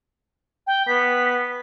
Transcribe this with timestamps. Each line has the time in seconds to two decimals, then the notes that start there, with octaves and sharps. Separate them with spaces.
0.67 G5
0.87 B3 B6